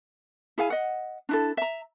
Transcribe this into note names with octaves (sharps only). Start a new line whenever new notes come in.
E4 G#4 F5 G#5
D#5 F#5
D4 E4 A4
E5 A#5